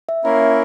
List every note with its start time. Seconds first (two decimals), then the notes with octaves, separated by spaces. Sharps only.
0.09 E5
0.24 A#3 C#4 E4 A#4 E5
0.41 E5